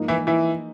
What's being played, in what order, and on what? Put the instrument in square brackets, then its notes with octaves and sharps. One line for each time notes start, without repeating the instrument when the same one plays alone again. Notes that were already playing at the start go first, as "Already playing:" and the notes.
Already playing: [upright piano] G#2 F3 A#3 D#4
[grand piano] E3 E4
E3 E4